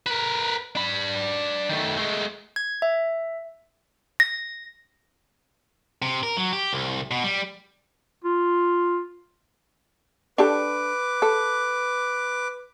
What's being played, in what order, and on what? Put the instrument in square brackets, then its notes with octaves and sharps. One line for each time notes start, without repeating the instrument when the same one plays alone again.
[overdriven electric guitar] A#4 B4
D4 B5
D#3 A3
G#3 A3
[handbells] G#6
E5
[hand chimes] A#6
[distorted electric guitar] C3
A#4
F#3
G4
C2
B2
G3
[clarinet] F4
[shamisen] D4 G4 A4 [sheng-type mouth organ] B4 D6
[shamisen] A4